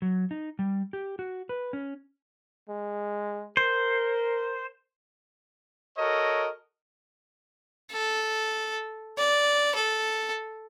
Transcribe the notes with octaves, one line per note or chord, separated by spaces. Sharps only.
F#3
D#4
G3
G4
F#4
B4
C#4
G#3
A#4 C5
F#4 A4 A#4 C#5 D#5
A4
D5
A4